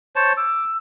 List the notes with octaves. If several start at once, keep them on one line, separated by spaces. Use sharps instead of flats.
C5 C#5 A5
D6 E6